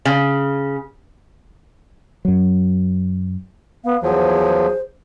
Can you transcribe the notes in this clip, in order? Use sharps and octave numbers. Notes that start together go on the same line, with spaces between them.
C#3
F#2 F#3
B3 F5
E2 F3 F#3 G#4 C5